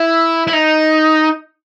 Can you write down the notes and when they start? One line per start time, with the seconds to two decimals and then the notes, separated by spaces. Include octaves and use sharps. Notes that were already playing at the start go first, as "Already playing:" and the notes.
Already playing: E4
0.47 E4
0.53 D#4